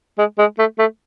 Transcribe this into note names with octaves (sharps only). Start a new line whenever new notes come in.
G#3
G#3
A3
A3